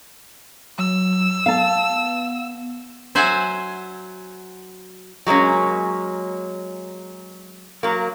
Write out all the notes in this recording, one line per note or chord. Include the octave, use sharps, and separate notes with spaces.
F#3 E6
B3 F5 A5
F#3 C5 E5 F#5 G#5
F#3 G#3 A#3 C#4
F#3 A#3